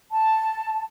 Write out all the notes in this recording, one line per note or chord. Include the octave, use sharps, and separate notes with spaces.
A5